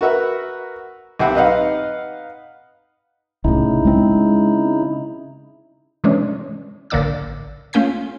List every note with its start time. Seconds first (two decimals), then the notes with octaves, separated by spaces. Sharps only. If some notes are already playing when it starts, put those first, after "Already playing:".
0.01 F#4 A#4 B4 E5 F#5
1.19 B1 C4 G4 E5 F#5 B5
1.35 D#4 B4 D#5 F5 F#5
3.44 C2 A2 C#3 D#4 E4
3.85 G#3 C4
6.04 C3 E3 G#3 C#4 D4
6.90 A1 D3 A#3 D4 D6 E6
7.73 A3 C#4 F4 G#5 G6 B6